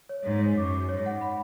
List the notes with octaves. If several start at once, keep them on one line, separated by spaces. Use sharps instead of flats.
C#5
G#2 C#5
C#5
F#2 D6
D6
G#2 C#5
F#5
B5